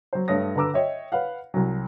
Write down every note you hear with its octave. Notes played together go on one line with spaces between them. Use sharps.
F#3 C5
G2 A3 C#5 D#6 A#6
D3 B4 A#5 D6 E6
C#5 D#5 E5 G5
B4 C#5 F5 F#5
C2 F#3